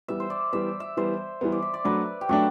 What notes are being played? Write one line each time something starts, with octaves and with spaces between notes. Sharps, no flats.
E3 G3 B3 E5
C5
D5
E3 G3 B3 E5
E5
E3 G3 B3 C5
E3 G3 B3
D5
E5
D5
F#3 A3 D4 B4
G4
F#3 A3 D4 F#4